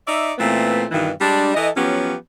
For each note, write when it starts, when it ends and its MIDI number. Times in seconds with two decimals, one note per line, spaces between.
0.07 0.31 63
0.07 0.31 74
0.07 0.31 76
0.38 0.84 46
0.38 0.84 52
0.38 0.84 57
0.38 0.84 59
0.38 0.84 60
0.91 1.10 43
0.91 1.10 47
0.91 1.10 51
0.91 1.10 52
1.21 1.50 55
1.21 1.50 56
1.21 1.50 62
1.54 1.68 52
1.54 1.68 69
1.54 1.68 75
1.75 2.14 53
1.75 2.14 54
1.75 2.14 59
1.75 2.14 61
1.75 2.14 67